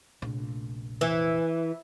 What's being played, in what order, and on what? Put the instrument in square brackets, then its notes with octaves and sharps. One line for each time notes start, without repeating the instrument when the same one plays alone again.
[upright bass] F1 A#1
[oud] E3